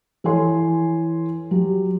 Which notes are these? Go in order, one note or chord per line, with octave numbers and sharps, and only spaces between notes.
E3 A4 C#5 G#5 C6
F#3 G4